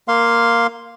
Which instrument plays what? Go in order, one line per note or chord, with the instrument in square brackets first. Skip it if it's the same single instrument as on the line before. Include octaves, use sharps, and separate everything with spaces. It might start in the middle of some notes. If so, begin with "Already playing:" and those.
[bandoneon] A#3 F5 C6